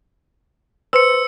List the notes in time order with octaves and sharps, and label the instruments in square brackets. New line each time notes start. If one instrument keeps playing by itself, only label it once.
[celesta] B4 C5 C6 [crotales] E6 C#7